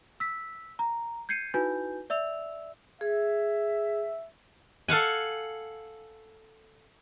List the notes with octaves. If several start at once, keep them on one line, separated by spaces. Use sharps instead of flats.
E6 B6
A#5
G6 G#6 C7 C#7 D#7
D#4 E4 F#4 B4 G#5 G6
D5 E5 E6 F7
G#4 E5
A4 F5 F#5 G#5